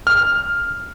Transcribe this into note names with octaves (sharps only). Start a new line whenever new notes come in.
F6